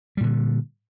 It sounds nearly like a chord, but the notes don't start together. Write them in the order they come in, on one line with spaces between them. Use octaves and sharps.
G3 A#2 D3